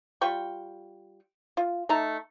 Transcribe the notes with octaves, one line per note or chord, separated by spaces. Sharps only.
G3 F4 G5 C#6
F4
A3 D#4 A5 A#5